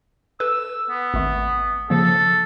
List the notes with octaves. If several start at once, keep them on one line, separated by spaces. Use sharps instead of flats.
A4 B4 E6
B3
G#1 A3
C#3 F3 A#3 A4